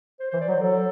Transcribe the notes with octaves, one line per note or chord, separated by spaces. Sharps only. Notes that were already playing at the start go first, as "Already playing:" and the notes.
C5
E3 C5
D5
F#3
C5
F#3 A4